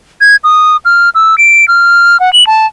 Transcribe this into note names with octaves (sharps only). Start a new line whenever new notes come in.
G#6
D#6
F6
E6
D7
F6
F#5
F#7
A5